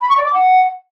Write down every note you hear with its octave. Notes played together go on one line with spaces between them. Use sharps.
B5
C#6
D5
D6
F#5